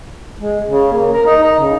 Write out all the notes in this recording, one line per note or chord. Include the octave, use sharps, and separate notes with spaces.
G#3
C#3
A#3
A#4
D#4
D#4
C#3